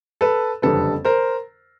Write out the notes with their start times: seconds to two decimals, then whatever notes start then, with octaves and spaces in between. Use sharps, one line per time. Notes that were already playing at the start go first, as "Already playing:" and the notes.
0.21 A4 B4
0.62 F#1 F2 D3 G3 A4 B4
1.05 A#4 C5